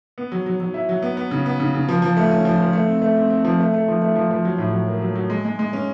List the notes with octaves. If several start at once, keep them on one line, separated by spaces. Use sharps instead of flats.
B3
F#3
F#3
F#3
E4
F#3
B3
B3
C#3
B3
C#3
C#3
F3
F3
A3
C#4
F3
F3
A3
C4
A3
C4
C4
F3
A3
A3
F3
A3
F3
F3
F#3
A2
F#3
A#3
F#3
F#3
G#3
G#3
G#3
C#4